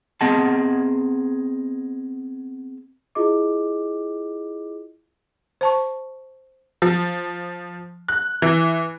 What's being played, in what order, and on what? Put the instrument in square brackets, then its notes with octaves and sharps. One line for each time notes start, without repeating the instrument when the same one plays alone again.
[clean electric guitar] B3 C4 G#4 D#5 F#5 A5
[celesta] E4 F4 G#4 D#5 D6
[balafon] C5 A5 C#6
[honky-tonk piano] F3
F#6
E3